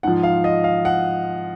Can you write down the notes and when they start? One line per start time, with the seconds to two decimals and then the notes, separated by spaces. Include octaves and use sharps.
0.03 G#2 F3 F#5
0.23 F5
0.44 D#5
0.64 F5
0.85 F#5